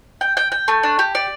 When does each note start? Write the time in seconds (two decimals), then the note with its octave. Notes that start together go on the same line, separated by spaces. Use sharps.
0.21 G5
0.37 G5
0.52 G5
0.68 A3
0.83 D4
0.99 G4
1.15 D5